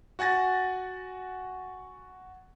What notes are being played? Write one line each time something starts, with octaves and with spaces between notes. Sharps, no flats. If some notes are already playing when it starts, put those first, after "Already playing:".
F#4 F#5 G#5 A6 A#6